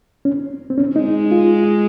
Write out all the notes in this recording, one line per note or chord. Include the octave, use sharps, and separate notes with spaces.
C#4
C4
C#4
G#3 D#4
F4